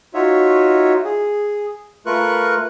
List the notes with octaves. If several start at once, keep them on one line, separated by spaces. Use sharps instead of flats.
D#4 F4 F#4 C#5 E5
G#4
A3 F4 A#4 B4 C#6 F#6